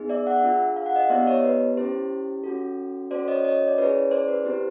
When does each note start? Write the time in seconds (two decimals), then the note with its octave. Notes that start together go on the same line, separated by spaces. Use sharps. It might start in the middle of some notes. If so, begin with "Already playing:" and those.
Already playing: B3 D#4 G#4
0.09 D5 E5
0.26 E5 F#5
0.43 D4 F4 G#4
0.76 F5
0.86 F#5
0.96 D#5 F5
1.10 B3 E4 G4 D5 E5
1.27 C#5 D#5
1.44 B4
1.77 C#4 E4 G4 C5
2.44 C#4 F#4 A4
3.11 C#4 F#4 A4 C5 D5
3.28 C#5 D#5
3.44 C#5 D#5
3.68 D5
3.78 C#4 E4 G#4 B4 C#5
4.11 C5 D5
4.28 B4
4.45 C4 E4 G4 C5